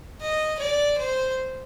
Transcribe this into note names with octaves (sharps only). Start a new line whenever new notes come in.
D#5
D5
C5